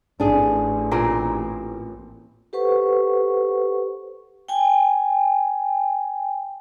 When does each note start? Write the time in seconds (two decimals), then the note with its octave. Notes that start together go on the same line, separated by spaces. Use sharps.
0.20 A1 D4 G#4
0.91 A#2 C4 A#4
2.53 G4 A4 B4 C5 F#5 C#6
4.48 G5 G#5